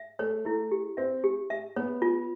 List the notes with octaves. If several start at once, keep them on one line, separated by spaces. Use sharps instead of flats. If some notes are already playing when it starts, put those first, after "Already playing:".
Already playing: E5
A3 C#5
A3 E4
G4
C4 E5
G4
E5
B3 C#5
F4